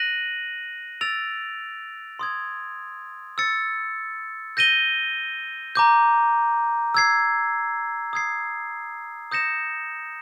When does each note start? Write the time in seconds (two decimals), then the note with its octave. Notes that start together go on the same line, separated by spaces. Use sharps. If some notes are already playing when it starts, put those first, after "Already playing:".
Already playing: F#6 A#6 D#7 F#7
1.01 E6 A6 D7 F7
2.19 C6 D#6 G#6
3.38 E6 A6 C#7
4.57 G6 A#6 D#7 G7
5.75 A#5 D6 G6
6.94 E6 G#6 C7
8.13 D#6 G#6 C7
9.31 D#6 G6 A#6 C#7 E7